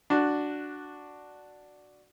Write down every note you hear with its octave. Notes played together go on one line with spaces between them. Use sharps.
D4 F#4